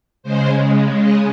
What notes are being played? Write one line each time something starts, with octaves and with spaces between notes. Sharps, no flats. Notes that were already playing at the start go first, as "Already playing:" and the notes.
C#3 G#3 C5
D#5